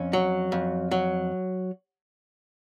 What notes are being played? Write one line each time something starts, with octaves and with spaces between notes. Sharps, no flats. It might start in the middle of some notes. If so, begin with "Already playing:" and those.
Already playing: F2 C#4
F#3
F2
F#3